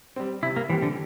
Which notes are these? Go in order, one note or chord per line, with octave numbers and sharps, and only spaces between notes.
G3 C4
C3 E4
A#3
E3 G3 C4 G4
D3